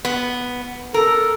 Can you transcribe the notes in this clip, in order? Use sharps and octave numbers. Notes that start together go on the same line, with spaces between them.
B3
A4 A#4